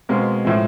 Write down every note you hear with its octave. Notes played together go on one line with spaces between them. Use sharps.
B2 G#3 A#3 C4
A2 F3 G#3